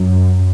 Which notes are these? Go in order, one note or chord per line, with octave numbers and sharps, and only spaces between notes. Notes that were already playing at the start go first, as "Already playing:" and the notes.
Already playing: F#2